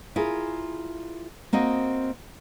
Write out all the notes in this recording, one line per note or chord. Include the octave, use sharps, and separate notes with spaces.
E4 F4 G#4 A#4
A#3 C4 F#4 D#5